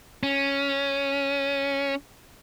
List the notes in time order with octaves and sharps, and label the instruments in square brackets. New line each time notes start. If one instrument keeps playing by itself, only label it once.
[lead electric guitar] C#4